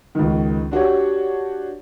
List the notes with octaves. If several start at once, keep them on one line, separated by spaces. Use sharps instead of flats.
C#2 D#3
D4 F#4 G4 C#5